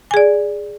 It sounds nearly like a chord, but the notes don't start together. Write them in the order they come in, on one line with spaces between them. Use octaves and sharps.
G#5 G#4 D5